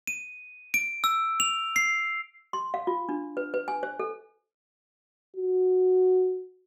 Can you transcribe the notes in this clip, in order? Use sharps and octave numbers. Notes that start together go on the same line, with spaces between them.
D#7
D7
E6
F7
C7
C6
F5
F4
D4
B4
B4
G#5
C5
A4
F#4